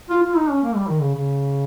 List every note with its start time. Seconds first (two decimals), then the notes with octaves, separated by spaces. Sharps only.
0.10 F4
0.23 F4
0.36 D#4
0.50 C#4
0.63 A#3
0.75 G3
0.88 D#3
1.01 C#3
1.15 C#3